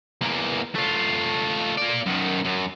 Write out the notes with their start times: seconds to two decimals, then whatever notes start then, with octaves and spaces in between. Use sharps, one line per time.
0.21 E2 A#3
0.75 A3 F4
1.77 A#3 D5
2.06 F#2 D#3
2.44 F#2